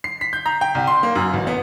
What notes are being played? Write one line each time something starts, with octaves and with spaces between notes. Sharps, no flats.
C7
B6
G6
A#5
G5
C2
C6
A#3
F#2
A1
B3